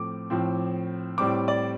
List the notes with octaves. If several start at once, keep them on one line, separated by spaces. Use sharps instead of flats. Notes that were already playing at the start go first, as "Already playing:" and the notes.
Already playing: A2 F3 A3 C4 D6
A2 F3 C4
A2 G3 C4 D6
D5